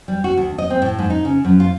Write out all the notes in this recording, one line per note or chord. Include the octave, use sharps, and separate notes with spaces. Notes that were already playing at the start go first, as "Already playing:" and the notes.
G3
F#4
D2
D#5
C4
A2
G#2
D#4
C#3
F#2
F4